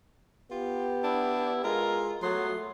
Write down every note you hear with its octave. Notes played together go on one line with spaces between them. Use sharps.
B3 F4 G4
D4 E4
G#3 F4 A#4
F#3 A3 B3 C6